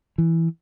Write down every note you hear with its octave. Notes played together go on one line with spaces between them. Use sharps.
E3